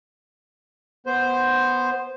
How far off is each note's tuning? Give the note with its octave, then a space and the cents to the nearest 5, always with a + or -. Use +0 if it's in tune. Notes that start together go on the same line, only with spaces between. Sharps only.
B3 +0 C5 +0